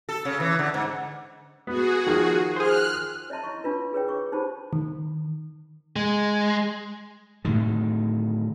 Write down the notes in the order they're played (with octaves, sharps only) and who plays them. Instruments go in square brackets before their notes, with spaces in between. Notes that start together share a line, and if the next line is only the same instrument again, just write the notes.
[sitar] A4
C#3
E3
D3
G#2
[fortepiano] B3 [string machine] F#4 G#4
[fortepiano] D#3 F3
[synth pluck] G#4 C5 [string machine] F6 F#6
[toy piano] C#5 D#5 E5 A5 C6
E4 C6 C#6
D4 F4 B4
G#4 B4 C#5 G5
C#6 D6
D#4 G4 C5 A5 B5
[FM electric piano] D#3
[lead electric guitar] G#3
[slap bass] A2 D3 D#3